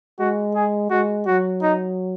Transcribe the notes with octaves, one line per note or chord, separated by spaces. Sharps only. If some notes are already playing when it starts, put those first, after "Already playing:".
G#3 F#4
G#4
G#3 F#4
F#3 F#4
D#4